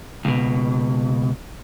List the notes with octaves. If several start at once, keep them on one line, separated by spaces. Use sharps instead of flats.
C#2 B2